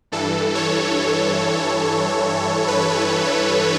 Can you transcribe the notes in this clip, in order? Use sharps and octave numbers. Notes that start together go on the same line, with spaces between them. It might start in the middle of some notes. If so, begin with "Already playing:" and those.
G2 E3 A4
C#5
B4